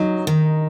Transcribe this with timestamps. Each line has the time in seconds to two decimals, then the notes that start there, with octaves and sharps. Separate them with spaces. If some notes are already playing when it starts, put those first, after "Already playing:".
Already playing: F#3 D#4
0.27 D#3